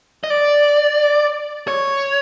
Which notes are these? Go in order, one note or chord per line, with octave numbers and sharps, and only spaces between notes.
D#5
D5
C#5